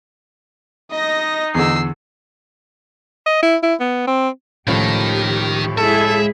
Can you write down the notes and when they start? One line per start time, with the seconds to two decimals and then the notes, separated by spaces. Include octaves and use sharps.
0.91 D#4 D#5 A#6
1.55 E2 D3 E6 C7
3.27 D#5
3.42 E4
3.63 E4
3.80 B3
4.07 C4
4.68 C#2 A2 D#3 F3 G4
5.78 G#3 E4 G#4 A4 E5